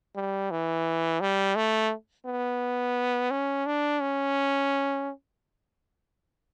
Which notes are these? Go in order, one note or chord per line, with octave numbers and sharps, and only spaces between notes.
G3
E3
G3
A3
B3
C#4
D4
C#4